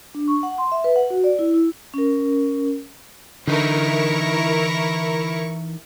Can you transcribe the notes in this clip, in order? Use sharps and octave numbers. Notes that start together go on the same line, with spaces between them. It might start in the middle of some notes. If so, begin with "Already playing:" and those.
D4
C#6
F#5
C6
E5
B4
F#5
F#4
D5
E4
E4
C#4 A#4
D3 E3 D#4 E4 A#4 C#6